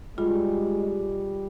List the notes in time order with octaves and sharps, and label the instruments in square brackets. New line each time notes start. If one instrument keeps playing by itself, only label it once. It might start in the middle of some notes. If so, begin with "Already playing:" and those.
[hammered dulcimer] G3 [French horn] G#3 [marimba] F4